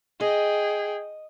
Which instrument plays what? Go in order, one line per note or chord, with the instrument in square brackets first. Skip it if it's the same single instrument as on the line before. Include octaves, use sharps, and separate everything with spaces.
[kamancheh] G#4 G5 [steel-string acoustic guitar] D#5